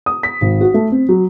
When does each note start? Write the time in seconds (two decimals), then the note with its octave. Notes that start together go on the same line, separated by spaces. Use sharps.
0.06 D#6
0.23 B6
0.41 G#1
0.61 F#4
0.74 A3
0.92 C4
1.09 F#3